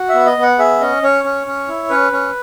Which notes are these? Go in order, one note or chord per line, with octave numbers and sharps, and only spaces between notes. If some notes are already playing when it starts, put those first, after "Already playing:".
Already playing: F#4
E5
B3
D#5
B3
F#5
G#4 E5
C#4 D#5
C#4 C#5
C#4
C#4
E4
C#4 B4
C#4